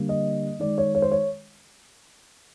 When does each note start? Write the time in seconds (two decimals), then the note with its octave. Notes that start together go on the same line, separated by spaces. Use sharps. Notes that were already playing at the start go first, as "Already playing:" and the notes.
Already playing: D3 G3 A#3
0.09 D#5
0.60 D#3 G#3 D5
0.78 C#5
0.95 C#5
1.02 C5
1.11 C#5